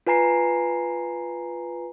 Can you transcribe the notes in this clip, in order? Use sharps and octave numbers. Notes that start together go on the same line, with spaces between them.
F4 B4 G#5 A#5 C7